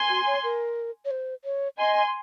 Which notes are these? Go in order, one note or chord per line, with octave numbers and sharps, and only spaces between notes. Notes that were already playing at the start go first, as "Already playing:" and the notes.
Already playing: G#5 C6
F#4
C#5
A#4
C#5
C5
C#5
D#5 G#5 C6